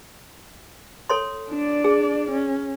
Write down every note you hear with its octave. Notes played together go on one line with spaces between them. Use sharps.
A4 C#5 C6
D4 D5
G#4
C#4